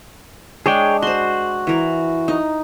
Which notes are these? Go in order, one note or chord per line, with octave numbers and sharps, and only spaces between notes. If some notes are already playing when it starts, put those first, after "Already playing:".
G#3 D4 G#4 C#5 G5
F#4 C5 C6
E3 A#4
D#4